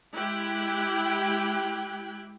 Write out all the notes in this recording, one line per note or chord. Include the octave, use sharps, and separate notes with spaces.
G#3 E4 G4 G5 F#6 G#6